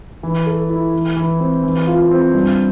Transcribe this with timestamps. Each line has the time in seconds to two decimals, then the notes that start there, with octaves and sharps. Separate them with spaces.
0.23 E3
0.46 A4
0.70 E4
0.94 E3
1.16 E3
1.40 C4
1.63 E3
1.87 F4
2.11 C4
2.34 G2